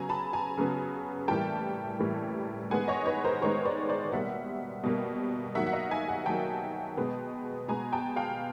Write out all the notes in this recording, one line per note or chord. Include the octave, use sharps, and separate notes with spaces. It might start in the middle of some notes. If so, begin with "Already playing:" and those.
Already playing: C#3 F#3 B3 G#5 A#5
A5 B5
G#5 A#5
C#3 F#3 B3
A2 E3 G3 A#3 G5 A5
A2 E3 G3 A#3
D#3 G#3 B3 F#5 G#5
C#5 D#5
B4 C#5
A#4 C5
D#3 G#3 B3 B4 C#5
C5 D5
C5 D5
B2 G3 A#3 E5 F#5
B2 G3 A#3
D#3 F#3 A#3 E5 F#5
F#5
D#5 F5
F#5 G#5
F#5 G#5
D#3 F#3 A#3 G5 A5
B2 G#3 B3
B2 G#3 B3 G#5 A#5
G5 A5
F5 G5